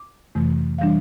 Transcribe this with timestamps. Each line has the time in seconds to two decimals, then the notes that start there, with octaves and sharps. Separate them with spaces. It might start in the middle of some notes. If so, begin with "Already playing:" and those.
Already playing: D6
0.35 F2 C3 E3 A3
0.78 E3 G3 D4 F5